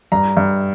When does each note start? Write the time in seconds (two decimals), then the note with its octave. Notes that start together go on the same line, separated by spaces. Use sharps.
0.12 G2 A#5
0.37 G2